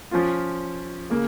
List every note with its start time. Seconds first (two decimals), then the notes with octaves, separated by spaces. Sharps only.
0.11 F3 C#4 F4
1.10 C#3 A#3